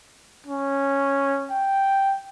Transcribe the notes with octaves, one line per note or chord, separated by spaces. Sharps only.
C#4
G5